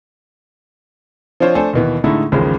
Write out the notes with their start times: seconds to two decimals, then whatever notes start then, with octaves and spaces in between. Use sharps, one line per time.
1.40 F3 C4 D4 F4 C5 C#5
1.55 A3 D4 A4 C5 G#5
1.73 D#2 B2 E3
2.04 A2 D3 G#3 A3 D#4 E4
2.32 A1 D#2 C#3 F3 G#3